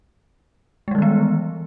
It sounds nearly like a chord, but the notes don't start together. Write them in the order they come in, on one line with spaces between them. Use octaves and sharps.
G#3 G3 E3 D#3 B3